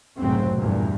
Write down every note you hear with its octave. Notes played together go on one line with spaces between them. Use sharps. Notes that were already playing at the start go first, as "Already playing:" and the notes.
F1 B1 G#2 C#3 F#3 C4
E2 G2 A#2